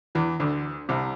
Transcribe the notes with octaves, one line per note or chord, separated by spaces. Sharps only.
E2 E3
D2 D3
C2 C3